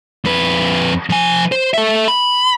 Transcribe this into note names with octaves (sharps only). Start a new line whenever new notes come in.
F2 B4
F3 G#5
C5
A4 E5
B5